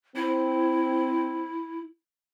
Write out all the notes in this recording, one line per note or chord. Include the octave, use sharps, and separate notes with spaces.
C4 E4